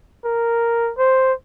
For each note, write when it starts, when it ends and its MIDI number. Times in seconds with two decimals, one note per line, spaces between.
0.24 0.91 70
0.98 1.33 72